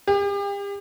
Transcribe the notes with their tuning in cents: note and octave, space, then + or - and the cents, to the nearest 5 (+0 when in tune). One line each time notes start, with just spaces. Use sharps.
G4 +40